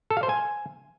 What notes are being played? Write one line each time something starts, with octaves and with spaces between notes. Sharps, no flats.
A4
F5
C5
G#5